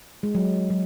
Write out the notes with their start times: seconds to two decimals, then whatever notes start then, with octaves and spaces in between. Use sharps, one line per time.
0.23 G#3
0.35 F#3
0.70 F#3